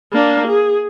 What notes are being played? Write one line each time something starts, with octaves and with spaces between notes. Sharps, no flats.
A#3 D4
G#4